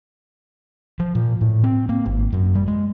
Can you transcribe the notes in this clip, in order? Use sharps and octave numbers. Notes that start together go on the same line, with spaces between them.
F3
A#2
A2
C4
A#3
G#1
F#2
G3
G#3